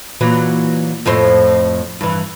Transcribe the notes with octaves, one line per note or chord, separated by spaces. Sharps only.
A#2 E3 F#3
F2 A2 C5
G2 E3